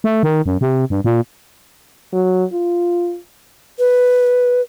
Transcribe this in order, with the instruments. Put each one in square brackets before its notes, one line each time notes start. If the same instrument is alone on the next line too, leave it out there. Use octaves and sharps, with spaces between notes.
[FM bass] A3
D#3
F#2
C3
G2
A#2
[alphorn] F#3
F4
[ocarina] B4